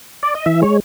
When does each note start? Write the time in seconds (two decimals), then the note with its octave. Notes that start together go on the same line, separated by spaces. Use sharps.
0.23 D5
0.35 D#5
0.46 E3 E5
0.62 G#3 C#5